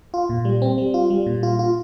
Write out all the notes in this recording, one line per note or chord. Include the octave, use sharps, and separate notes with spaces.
F4
A#2
G3
C4
G3
F4
G3
A#2
F4
F4